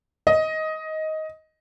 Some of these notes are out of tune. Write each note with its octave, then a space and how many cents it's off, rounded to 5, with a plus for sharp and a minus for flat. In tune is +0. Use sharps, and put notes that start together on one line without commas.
D#5 +15